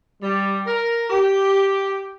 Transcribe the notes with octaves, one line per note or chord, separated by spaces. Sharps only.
G3
A#4
G4